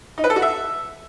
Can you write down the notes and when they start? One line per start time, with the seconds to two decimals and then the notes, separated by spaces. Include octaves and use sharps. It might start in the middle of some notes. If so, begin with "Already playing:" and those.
0.18 D#4
0.24 B4
0.30 A4
0.36 F#4
0.42 E5